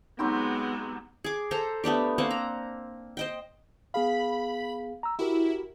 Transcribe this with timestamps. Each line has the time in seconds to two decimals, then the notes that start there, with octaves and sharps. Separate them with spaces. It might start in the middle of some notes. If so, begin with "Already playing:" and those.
0.19 F#3 G#3 B3 C4 D#4 G4 B5
1.24 G#4 D6
1.51 A4 C5 A#5
1.84 A3 B3 D4 G4
2.18 A#3 C4 C5 F#5
2.31 A#5
3.17 C5 D#5 G5
3.94 B3 G#4 F5 B5
5.03 A#5 E6
5.19 E4 F#4 G4 A#4